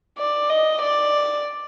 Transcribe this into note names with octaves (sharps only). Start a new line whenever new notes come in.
D5
D#5
D5